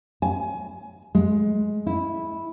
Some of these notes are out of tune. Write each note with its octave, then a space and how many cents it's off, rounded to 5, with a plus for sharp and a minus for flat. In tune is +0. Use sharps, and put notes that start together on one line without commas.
G#5 +25
G#3 +15
E4 -10